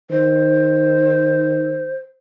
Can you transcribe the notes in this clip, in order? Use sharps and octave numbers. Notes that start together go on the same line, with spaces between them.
D#3 C5